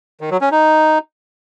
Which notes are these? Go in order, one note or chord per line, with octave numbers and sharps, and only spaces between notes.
D#3
F#3
C#4
D#4